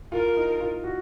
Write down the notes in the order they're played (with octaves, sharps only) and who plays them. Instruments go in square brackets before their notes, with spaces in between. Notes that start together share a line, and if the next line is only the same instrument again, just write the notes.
[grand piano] F4 [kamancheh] A#4
[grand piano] D#4
F4
F#4